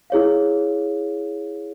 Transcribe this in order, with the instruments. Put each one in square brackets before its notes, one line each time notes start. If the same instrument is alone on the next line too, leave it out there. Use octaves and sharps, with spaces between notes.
[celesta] E4 G#4 C#5 F5